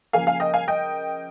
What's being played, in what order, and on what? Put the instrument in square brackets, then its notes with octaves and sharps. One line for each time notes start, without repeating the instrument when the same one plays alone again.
[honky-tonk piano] C#3 F3 A#3 F5 G#5
F5 G#5
D#5 G5
F5 G#5
D#5 G5